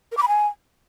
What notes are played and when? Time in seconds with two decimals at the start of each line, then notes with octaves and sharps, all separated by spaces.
0.12 A#4
0.17 D6
0.22 B5
0.28 G#5